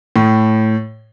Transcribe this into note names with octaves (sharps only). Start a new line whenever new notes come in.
A2